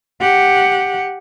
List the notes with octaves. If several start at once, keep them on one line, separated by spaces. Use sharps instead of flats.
G4 F#5